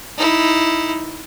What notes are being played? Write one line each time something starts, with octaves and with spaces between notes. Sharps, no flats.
D#4 E4